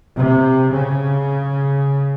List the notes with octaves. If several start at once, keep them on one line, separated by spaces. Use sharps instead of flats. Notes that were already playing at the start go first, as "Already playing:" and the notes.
C3
C#3